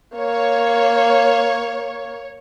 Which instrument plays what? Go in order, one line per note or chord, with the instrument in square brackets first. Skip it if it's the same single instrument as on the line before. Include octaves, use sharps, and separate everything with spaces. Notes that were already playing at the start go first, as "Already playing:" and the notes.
[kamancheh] A#3 [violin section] C#5